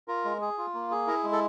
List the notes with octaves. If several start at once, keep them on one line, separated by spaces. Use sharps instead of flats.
F4 A#4
G#3
G#4
F4
A#3
G#4
E4 A#4
G#3
A4